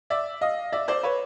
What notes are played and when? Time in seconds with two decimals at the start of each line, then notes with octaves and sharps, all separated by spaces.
0.10 D5 E5
0.41 D#5 F5
0.72 D5 E5
0.88 C5 D5
1.03 B4 C#5